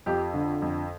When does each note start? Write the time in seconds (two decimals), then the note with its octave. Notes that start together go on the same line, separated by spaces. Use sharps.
0.06 F2 G4
0.34 D3
0.62 F2